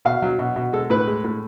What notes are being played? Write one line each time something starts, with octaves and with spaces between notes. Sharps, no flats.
B2 F5
F#3
B2
B2
G#3 A4
A2 B4
G#3
A2